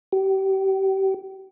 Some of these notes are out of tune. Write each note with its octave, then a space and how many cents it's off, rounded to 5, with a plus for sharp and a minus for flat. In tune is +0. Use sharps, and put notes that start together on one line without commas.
G4 -30